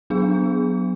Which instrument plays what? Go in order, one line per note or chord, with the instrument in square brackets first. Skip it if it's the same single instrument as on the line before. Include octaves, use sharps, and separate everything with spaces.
[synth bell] F#3 B3 D4 G#4